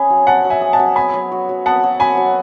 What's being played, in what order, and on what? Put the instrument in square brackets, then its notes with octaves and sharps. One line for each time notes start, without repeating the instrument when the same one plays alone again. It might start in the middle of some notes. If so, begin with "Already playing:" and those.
Already playing: [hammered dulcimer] C#4 G#4 [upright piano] G#5 B5
[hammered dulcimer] F#3
[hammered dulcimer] C#4 [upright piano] F#5 A5
[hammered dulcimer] F#3
[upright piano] E5 G#5
[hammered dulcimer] G#4
[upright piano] F#5 A5
[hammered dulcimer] F#3
[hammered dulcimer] B3 [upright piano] G#5 B5
[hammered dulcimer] F#3
F#4
F#3
[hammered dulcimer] B3 [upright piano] F#5 A5
[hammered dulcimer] F#3
[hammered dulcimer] F#4 [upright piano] G#5 B5
[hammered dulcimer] F#3